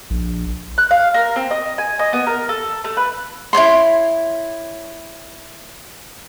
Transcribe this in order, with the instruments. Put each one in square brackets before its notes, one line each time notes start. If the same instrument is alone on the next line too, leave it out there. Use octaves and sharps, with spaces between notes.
[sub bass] A#1
[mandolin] F#6
F5
A#4
C4
D#5
G#5
D#5
B3
A#4
A4
A3
B4
[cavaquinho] E4 A4 C#5 C6